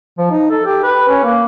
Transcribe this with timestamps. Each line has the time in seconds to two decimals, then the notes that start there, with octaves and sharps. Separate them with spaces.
0.18 F3
0.31 D#4
0.51 A4
0.65 G4
0.83 B4
1.09 C#4
1.23 A#3